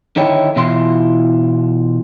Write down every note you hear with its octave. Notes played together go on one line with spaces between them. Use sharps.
D3 D#3 D#4 E4 C#5 G5
B2 E3 E4 F4 C6